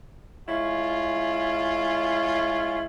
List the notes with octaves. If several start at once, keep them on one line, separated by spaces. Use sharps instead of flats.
G#3 C#4 E4 F4